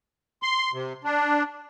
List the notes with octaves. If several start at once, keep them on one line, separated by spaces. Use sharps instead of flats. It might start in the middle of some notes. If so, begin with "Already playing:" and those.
C6
C3
D4